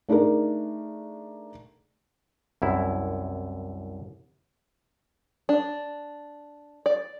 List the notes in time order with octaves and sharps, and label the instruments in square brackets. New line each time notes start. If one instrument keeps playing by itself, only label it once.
[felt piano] A3 D4 D#4 G#4 A#4
[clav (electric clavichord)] C2 F#2 E4
[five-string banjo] D4
D5